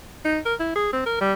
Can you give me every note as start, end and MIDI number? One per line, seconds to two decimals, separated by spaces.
0.25 0.39 63
0.45 0.54 70
0.60 0.72 64
0.76 0.88 68
0.93 1.02 60
1.06 1.19 70
1.21 1.34 55